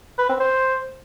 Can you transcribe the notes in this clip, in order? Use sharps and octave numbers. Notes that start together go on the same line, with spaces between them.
B4
C4
C5